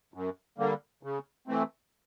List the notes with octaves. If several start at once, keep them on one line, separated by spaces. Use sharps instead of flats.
F#2
D3 G3 A#3
C#3
E3 A3 C4